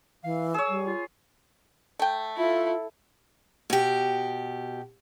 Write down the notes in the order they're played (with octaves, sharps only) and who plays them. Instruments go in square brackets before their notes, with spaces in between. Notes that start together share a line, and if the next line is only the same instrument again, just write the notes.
[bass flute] E3 [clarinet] F5
[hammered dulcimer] G#4 C#5 [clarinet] E6
[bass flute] G3
[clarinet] F4
[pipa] A3 G5
[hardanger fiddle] E4 A4 [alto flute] F4
[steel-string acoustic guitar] B2 G4